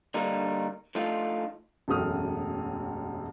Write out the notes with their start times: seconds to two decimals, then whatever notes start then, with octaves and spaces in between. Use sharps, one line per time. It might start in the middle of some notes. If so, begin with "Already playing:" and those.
0.14 D3 G3 A#3 D4 D#4
0.95 F3 A3 D4 D#4 F4
1.88 E1 A1 F#2 A3 D#6 F6